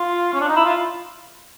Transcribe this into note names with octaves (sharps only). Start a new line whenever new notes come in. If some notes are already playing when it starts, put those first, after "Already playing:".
Already playing: F4
C#4
D4
D#4
E4
F4